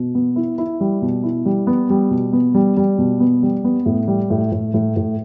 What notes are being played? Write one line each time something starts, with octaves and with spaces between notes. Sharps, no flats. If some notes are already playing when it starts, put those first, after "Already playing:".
Already playing: B2
B3
E4
E4
G3
B2
E4
G3
B3
G3
B2
B3
G3
G3
B2
B3
G3
B3
A2
G3
A2
A2
A2
A2